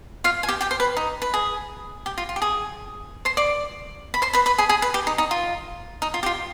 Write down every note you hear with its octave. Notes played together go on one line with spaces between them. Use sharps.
F4 F5
G#5
G4 G5
G4 G5
C5
B4
D#4
B4
G#4
G4
F4
F4
G4
G#4
C5 C6
D5 D6
B5
C5 C6
B4 B5
B4 B5
G#4 G#5
G#4 G#5
B4
G4
D#4
D#4
F4
D#4
F4
G4
F4